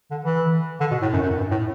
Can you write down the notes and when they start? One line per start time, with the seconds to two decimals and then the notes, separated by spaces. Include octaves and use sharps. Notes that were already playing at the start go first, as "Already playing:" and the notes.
0.11 D3
0.25 E3
0.80 D3
0.91 B2
1.02 A2
1.13 F#2
1.23 F#2
1.37 G2
1.51 A2